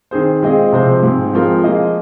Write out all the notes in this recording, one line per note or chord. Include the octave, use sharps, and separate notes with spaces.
D#3 C4 G#4 C5
A#2 G#3 C4 G#4 D#5
C3 F3 C4 G#4 C5
G#2 G#3 C4
F3 G#3 C4 F4 A#4
F3 A#3 F4 G#4 D#5